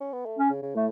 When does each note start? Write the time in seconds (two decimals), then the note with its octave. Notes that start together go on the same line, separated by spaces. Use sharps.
0.01 C#4
0.13 B3
0.26 A3
0.39 C#4
0.50 C#3
0.62 C#3
0.75 A2 A3